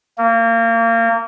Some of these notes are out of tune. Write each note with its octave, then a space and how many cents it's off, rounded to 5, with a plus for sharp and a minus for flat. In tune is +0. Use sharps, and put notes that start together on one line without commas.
A#3 -30